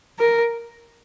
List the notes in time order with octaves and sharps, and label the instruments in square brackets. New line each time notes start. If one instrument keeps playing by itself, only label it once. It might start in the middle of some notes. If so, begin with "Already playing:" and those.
[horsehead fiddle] A#4